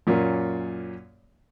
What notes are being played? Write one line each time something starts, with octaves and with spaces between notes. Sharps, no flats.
F#2 A#2 A#3 C#4